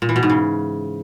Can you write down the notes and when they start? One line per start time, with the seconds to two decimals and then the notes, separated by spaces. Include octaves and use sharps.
0.02 A#2
0.09 E3
0.16 B2
0.23 G#2
0.30 C#3